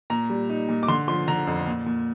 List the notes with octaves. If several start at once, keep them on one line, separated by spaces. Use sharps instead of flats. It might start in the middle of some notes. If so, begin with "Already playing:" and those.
A#2 A#5
G3
D#4
A#2
D6
D3 C6
F3 C6
D3 A#5
F2
A#2
A#2